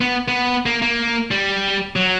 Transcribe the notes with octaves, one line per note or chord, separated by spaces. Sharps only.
B3
B3
A#3
A#3
G3
F#3